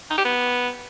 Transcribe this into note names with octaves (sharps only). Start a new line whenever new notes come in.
D#4
G4
B3